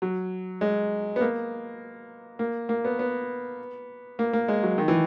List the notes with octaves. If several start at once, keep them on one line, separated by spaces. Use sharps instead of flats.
F#3
G#3
B3
A#3
A#3
A#3
B3
B3
A#3
A#3
G#3
F#3
D#3
E3